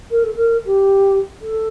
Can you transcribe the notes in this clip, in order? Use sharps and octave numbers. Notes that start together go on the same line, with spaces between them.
A#4
A4
A#4
G4
A4